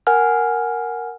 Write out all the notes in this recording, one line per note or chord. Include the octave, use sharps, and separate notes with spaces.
A#4 F#5 G#5 F6